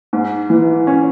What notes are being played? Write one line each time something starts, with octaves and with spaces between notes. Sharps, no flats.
G#2
E3
C#4